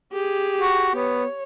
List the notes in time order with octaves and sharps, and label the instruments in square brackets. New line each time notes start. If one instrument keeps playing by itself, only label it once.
[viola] G4 G#4
[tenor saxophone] F#4
[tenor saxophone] B3 [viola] C#5